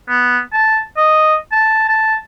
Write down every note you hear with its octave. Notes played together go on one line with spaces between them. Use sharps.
B3
A5
D#5
A5
A5